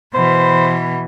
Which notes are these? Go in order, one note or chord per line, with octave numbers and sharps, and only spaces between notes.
B2 E3 C5